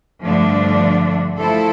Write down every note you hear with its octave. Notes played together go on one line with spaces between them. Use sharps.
G2 D3 F3 A3 D4
F3 A3 E4 A4 C5